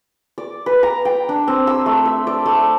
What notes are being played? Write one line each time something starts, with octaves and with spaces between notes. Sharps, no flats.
D5
B4
A#5
G5
D4
C4
E6
A3
E5
D5
A3